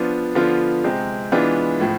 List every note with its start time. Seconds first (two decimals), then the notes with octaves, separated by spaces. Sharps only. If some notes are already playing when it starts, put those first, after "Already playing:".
Already playing: F3 B3 D4 F4
0.35 D3 F3 B3 F4
0.84 C3 G#3 C4
1.32 E3 G#3 B3 D4 F4
1.80 A2 F3